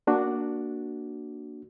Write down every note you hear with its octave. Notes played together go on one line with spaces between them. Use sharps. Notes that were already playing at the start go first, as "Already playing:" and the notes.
A#3 D4 F#4